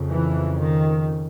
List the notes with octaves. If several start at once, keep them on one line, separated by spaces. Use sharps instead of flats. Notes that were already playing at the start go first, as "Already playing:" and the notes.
Already playing: F2 C#3
E3
D#3